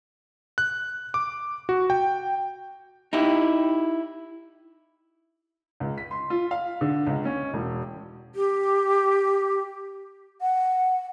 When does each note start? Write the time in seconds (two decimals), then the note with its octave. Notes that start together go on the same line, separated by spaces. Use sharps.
0.58 F#6
1.14 D6
1.69 F#4
1.90 G5
3.13 D#4 E4 G4
5.80 C#2
5.98 B6
6.11 C6
6.30 F4
6.51 F5
6.81 D3
7.06 C#2
7.25 C#4
7.54 E1
8.35 G4
10.41 F#5